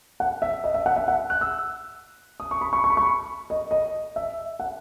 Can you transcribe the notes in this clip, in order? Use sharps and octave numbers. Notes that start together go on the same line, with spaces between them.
F#5
E5
D#5
E5
F#5
E5
F#5
F#6
E6
D#6
C#6
B5
C#6
C#6
B5
C#6
D#5
D#5
E5
F#5